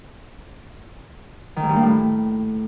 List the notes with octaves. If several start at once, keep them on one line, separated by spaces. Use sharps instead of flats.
D#3
G#2
G2
A#3
A2